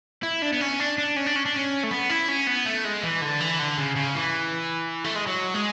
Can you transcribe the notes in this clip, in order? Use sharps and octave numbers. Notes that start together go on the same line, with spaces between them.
E4
D4
B3
C#4
D4
D4
C#4
D4
C#4
D4
C#4
A3
B3
E4
C#4
B3
A3
G#3
E3
D3
E3
D3
C#3
C#3
E3
A3
G#3
F#3
G#3